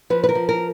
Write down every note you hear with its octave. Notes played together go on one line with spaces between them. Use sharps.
F3 B4
B4
A#4
F3
A#4